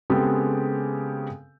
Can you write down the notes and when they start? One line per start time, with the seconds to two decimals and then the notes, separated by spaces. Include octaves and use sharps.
0.10 C#3 G#3 B3 C4 G4 A4